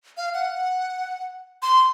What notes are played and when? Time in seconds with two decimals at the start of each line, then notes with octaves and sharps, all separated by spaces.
0.17 F5
0.34 F#5
1.62 C6